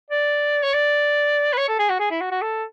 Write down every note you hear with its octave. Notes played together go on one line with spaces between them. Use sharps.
D5
C#5
D5
B4
C#5
A4
G#4
F#4
G#4
E4
F#4
F#4
A4